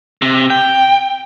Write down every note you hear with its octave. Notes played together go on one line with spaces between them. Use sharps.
C3
G5